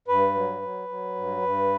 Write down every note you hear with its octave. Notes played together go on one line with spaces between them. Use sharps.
G2 B4
F#3
F#3
F#3
G2
G2